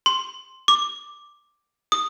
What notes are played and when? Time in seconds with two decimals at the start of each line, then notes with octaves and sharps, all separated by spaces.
0.06 C6
0.68 D6
1.92 D#6